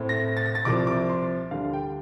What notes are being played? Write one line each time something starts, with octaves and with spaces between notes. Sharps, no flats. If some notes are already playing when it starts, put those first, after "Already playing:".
Already playing: A2 A3 C4
A#6
A6
A#6
A6
C2 C3 F3 D6
D6
C6
D2 D3 G3 D4 F5
G5